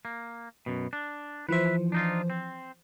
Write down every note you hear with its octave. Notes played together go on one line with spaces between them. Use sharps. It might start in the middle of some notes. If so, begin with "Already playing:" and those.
A#3
F#2 B2
D4
E3 F3 B4 C5 E5
D4 D#4 F4
C4